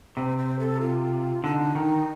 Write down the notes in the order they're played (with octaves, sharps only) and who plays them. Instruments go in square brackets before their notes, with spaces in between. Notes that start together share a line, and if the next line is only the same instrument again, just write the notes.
[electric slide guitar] C3 [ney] C5
[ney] C5
A4
F4
[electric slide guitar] D3 [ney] D#4
[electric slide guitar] D#3